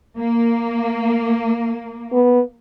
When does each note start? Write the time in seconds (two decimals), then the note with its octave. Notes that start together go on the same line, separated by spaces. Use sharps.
0.18 A#3
2.12 B3